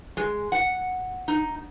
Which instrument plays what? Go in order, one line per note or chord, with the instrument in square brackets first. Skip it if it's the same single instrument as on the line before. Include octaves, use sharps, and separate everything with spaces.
[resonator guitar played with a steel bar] G#3
F#5
D#4